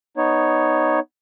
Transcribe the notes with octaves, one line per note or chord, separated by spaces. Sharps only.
B3 D#4 C#5